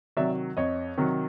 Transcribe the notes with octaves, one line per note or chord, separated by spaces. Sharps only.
C3 D#3 F#3 D5 E5
F2 C#5 D#5
C3 D#3 F#3